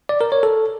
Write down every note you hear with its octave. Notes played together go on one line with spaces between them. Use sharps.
D5
A#4
C#5
A4